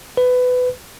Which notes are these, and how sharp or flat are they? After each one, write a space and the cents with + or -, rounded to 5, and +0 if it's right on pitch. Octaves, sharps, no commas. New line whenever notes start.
B4 +20